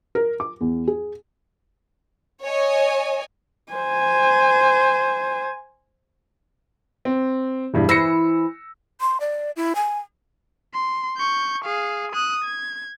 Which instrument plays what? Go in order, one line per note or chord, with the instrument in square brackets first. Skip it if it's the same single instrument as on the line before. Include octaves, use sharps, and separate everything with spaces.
[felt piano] A#4
D6
E2
G#4
[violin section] C#5 D#5 G#5
[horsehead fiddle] C5 G#5
[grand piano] C4
E1 G2 E4
[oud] E3 C5 [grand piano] E6 A#6 C#7
[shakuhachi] C6
D5
E4
G#5
[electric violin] C6
C#6 G6
G#4 F5
D#6 F#6
G#6